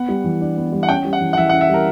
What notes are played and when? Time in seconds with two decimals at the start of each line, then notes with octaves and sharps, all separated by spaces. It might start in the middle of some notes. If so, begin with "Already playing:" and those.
Already playing: B3 F#5
0.09 G3
0.24 E3
0.41 D4
0.57 B3
0.73 G3
0.83 F#5
0.89 C#4 G5
1.05 G3
1.13 F#5
1.21 E3
1.33 F#5
1.37 E3 E5
1.49 F#5
1.53 C#4
1.61 E5
1.70 G3 A#4